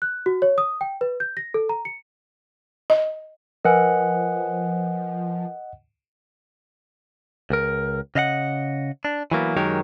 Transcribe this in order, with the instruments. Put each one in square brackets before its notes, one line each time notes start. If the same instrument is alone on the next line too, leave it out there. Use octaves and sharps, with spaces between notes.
[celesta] F#6
F#4
C#5
D#6
G5
B4
G6
A#6
A4
A#5
C#7
[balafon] D#5
[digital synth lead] F3 [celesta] A#4 B4 G#5 [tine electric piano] D#5 F#5
[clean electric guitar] C#2 A#4
C#3 D#5 F5 F#5
D4
E3 F#3 A#3 B3
F#2 D#3 F#3 G#3 G4 A#4